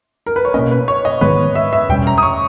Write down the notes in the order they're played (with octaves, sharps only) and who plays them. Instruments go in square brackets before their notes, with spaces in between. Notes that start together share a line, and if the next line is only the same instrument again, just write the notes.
[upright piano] A#4
B4
C#5
[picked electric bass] B2 A#3 C#4 [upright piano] D#5
[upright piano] B4
C#5
D#5
[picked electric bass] G#2 D#3 G#3 B3 [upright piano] B4
[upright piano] E5
E5
[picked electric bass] E2 B2 G3 C#4 [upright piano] G5
[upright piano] A#5
D#6
C#6